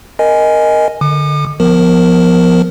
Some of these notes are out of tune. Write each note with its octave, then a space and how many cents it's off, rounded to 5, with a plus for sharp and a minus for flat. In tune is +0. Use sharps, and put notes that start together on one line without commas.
A#4 +0 D#5 +0 G#5 +0
D3 +0 D6 +45
F3 +10 B3 +0 A#4 +0